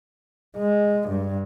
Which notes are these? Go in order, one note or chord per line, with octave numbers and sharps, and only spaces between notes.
G#3
G2